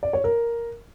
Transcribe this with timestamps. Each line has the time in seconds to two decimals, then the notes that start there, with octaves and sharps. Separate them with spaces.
0.03 D5
0.13 C#5
0.24 A#4